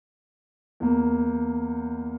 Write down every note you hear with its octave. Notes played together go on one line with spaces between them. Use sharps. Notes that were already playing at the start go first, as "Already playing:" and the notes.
E2 A#3